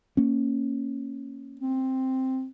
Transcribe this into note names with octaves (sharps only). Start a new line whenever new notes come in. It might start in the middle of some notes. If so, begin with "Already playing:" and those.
A#3 C#4
C4